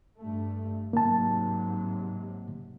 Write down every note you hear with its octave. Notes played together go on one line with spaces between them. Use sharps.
G2 A3
G#2 C3 F#3 A#3 A5